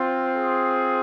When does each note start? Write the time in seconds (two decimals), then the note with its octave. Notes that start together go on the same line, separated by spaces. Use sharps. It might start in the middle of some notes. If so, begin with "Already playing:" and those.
Already playing: C4 F4
0.36 G#4